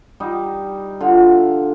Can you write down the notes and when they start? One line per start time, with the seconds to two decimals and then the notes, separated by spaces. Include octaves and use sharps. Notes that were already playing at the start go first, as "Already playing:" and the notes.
0.20 G3 D#4
1.01 D3 F4